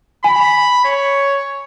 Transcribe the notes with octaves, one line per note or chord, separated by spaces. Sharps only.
G#5 B5
C#5